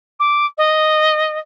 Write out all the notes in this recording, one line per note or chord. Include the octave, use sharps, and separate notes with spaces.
D6
D#5